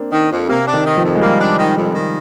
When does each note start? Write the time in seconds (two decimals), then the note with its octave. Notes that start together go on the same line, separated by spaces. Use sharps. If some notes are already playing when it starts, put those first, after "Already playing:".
Already playing: A#3 C4 D4
0.12 D#3
0.31 F2
0.48 C3 A#3
0.67 D4
0.73 D#3
0.85 D#3
0.97 F3
1.04 F2
1.15 G#3
1.21 G3 A#3
1.40 D4
1.58 D#3
1.76 F2
1.95 D#3